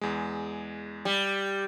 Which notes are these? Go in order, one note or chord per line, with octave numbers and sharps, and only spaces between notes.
E2 G#3
G3